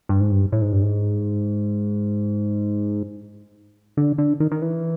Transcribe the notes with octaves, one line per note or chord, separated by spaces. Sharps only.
G2
G#2
G2
A2
G#2
G2
G#2
D3
D3
D#3
D#3
E3